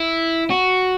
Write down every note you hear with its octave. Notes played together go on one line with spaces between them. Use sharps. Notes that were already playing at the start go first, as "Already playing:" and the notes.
Already playing: E4
F#4